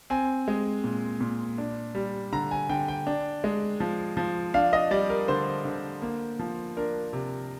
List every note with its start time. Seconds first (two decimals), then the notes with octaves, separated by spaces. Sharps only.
0.10 C4 G#5
0.48 G#3
0.84 A#2
1.21 A#2
1.58 D4
1.95 G3
2.33 D3 A#5
2.51 G#5
2.69 D3 G5
2.88 G5
3.07 D4
3.44 G#3
3.80 F3
4.17 F3
4.54 D4 F5
4.73 D#5
4.91 G3 D5
5.10 A#4
5.28 D3 C5
5.65 D3
6.02 A#3
6.39 F3
6.77 D4 A#4
7.13 C3